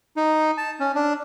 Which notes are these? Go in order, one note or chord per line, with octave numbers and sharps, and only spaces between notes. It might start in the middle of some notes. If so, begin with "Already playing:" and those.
D#4
A5
C#4
D4